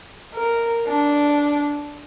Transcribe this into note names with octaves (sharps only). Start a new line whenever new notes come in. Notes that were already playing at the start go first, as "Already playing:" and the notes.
A#4
D4